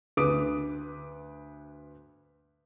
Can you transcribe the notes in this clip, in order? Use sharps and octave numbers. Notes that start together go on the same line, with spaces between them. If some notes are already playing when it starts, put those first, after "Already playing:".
D2 B4 D6 D#6 D7